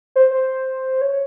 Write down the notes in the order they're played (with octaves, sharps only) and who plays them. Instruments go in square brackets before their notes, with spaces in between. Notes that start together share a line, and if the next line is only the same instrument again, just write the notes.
[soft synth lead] C5
C5
C#5